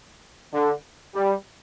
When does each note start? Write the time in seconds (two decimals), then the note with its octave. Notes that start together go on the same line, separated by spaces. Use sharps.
0.52 D3
1.14 G3